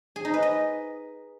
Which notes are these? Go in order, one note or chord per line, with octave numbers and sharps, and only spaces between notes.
G#4
D#4
B4
D#5